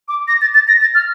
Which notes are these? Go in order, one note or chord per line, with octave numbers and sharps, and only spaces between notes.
D6
A#6
A6
A6
A#6
A6
F6